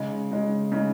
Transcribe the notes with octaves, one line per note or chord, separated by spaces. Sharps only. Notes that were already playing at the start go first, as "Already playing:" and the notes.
Already playing: C#3 G#3 D#4
C#3 G#3 D#4
C#3 G#3 D#4